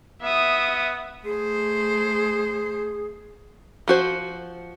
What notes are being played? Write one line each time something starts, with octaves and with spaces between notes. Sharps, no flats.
B3 E5 D#6
A3 G#4 C5
F3 F#4 C5